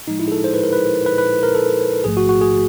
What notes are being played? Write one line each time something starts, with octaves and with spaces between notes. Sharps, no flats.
A2 F3 G#3 D#4
E4
G#4
A4
C5
B4
A#4
B4
B4
B4
A#4
A4
A1 G#2 F3 A3 G#4
F#4
F#4
G#4